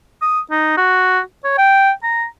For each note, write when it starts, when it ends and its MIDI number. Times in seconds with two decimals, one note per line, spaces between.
0.22 0.40 87
0.51 0.75 63
0.77 1.20 66
1.44 1.53 73
1.58 1.91 79
2.03 2.25 82